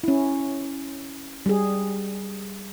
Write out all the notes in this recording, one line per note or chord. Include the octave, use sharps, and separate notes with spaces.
C#4 E4
G3 G#4